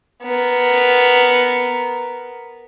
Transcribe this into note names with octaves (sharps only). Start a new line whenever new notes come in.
B3 A#4